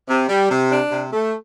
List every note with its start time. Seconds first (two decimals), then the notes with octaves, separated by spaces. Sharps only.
0.10 C3
0.29 G3
0.51 C3
0.71 D4
0.91 C3
1.13 A3